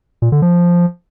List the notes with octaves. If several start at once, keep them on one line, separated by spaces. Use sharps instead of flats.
A#2
D3
F3